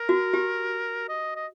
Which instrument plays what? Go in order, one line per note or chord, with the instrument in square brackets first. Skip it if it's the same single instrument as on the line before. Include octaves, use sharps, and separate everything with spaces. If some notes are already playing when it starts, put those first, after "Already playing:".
Already playing: [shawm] A#4
[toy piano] F#4
G4
[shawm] D#5
D#5